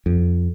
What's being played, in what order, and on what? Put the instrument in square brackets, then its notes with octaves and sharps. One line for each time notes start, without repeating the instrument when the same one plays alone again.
[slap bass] F2